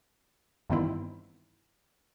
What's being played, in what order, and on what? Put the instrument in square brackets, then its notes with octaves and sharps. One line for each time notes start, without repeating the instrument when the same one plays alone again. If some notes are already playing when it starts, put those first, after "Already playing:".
[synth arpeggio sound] G2 D#3 E3 B3 C4 E4